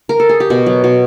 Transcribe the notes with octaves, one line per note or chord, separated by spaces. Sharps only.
A#4
A4
G#4
G4
B2 F#4
F#3
B2 F#4